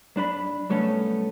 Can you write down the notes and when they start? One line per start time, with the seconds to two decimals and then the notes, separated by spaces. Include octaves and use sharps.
0.16 F#2 D4 B4 B5
0.70 C2 F#3 A3 B3 C#4 A4